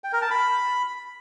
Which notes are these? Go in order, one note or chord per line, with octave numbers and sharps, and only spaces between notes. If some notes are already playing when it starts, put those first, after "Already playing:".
G5
A#4
A5
B5